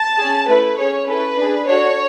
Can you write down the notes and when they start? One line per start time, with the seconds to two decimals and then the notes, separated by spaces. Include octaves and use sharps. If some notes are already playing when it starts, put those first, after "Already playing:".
Already playing: A5
0.18 C#4 G#4
0.48 A3 E4 A4 B4
0.78 C#4 G#4 C#5
1.07 C#4 E4 A4 B4
1.37 D4 G#4
1.67 D4 F#4 A4 C#5